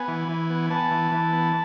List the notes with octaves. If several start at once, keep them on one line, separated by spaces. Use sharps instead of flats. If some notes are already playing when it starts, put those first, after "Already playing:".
Already playing: B3 G#5
E3
E3
B3
B3 A5
E3
E3
B3